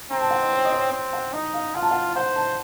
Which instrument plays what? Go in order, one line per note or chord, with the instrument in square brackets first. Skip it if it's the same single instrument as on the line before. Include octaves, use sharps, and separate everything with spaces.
[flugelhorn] C4 [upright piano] A#5
[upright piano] A5
F#5
D#5
C#5
D#5
C#5
[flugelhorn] C4
[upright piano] F#5
[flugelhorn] D#4 [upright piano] D#5
[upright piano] F5
[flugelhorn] F4 [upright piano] F#5
[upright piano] A5
F#5
[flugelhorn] C5 [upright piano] F#5
[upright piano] A5